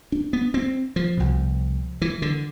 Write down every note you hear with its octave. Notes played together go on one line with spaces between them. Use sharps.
D4
B3
C4
F3
C2 B2
E3
D3